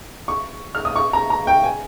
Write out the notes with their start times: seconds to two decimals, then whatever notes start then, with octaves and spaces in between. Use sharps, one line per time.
0.28 C#6
0.75 F6
0.85 D#6
0.96 C#6
1.13 A#5
1.30 A#5
1.47 G5
1.64 G#5